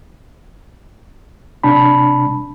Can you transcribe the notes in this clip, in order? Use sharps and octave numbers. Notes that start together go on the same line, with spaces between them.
C3 D4 A5 B5